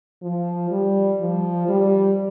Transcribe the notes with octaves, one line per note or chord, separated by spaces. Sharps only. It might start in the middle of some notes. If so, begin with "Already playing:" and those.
F3
G3
F3
G3